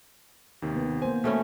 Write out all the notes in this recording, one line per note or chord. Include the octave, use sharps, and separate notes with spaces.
D#2 C3 D#3
B3
A#3 C5 G#5
B2 E3 A3 C#4